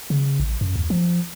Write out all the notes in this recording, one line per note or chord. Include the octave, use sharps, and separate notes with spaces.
C#3
A1
F#2
D#2
F3